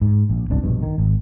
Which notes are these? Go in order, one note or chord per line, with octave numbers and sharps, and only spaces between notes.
G#2
A#1
D1 G1 C2 D4
A#1 G2 B2
D#3
G#1